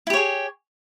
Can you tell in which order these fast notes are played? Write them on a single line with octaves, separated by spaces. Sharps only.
E4 G4 C#5 G#4